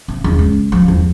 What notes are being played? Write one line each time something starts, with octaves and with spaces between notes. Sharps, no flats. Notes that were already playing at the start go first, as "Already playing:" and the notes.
C3
E2
C#2
F3
E2